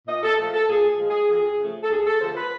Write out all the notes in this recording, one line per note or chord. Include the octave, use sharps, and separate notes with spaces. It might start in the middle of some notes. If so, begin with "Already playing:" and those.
A#2 D#5
A4
F3 A3 A4
A4
A#2 G#4
G#4
F3 G#3
G#4
F2 G#4
C#3 F3 A3
A4
D#2 G#4
A4
D3 F3 A3 C5
B4